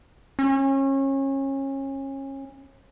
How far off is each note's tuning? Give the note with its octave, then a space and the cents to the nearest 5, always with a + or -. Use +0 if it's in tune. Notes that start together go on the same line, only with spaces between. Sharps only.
C#4 -30